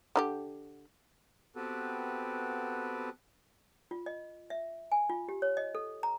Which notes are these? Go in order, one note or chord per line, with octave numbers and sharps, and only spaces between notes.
D3 D#4 G4
B3 C4 F#4 G4 A4 B4
F4
D#5
E5
G#5
F4
G4
C#5
D#5
A4
A#5